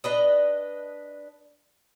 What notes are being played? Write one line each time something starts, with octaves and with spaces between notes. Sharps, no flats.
D4 B4 D#5